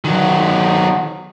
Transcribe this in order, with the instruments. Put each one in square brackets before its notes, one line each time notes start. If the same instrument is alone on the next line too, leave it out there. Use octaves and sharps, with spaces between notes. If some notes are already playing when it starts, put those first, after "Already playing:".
[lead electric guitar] D#3 F#3